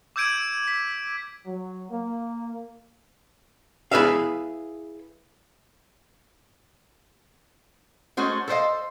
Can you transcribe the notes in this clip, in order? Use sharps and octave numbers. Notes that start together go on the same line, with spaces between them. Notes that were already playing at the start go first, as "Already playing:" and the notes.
D6 E6 G6 G#6 D7 D#7
B6
F#3
A#3
E4 G#4 B4 E5 F5
G#3 A3 C#4 F#4 C5
A4 B4 C5 D5 D#5 F5